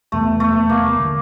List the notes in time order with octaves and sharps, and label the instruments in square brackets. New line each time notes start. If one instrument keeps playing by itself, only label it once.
[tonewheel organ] E2 C3 E3 G3 B3 [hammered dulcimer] A3
[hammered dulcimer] A3
A#3
[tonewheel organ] D3 G3